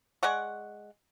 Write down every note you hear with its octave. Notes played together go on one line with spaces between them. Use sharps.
G#3 D5 F#5 C#6